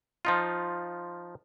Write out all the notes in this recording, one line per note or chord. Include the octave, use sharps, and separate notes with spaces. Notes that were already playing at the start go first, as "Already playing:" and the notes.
F3 D#4 F4